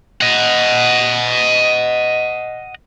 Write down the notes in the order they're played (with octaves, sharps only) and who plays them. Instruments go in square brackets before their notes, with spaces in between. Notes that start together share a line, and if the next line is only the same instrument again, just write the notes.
[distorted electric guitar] D#5 F#5